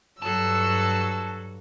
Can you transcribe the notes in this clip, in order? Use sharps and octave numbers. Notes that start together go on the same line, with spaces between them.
G2 F#3 F#4 A4 A5 E6